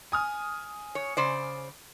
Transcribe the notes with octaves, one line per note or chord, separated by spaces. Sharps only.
G#5 D#6 F6
C#5
C#3 C5 D5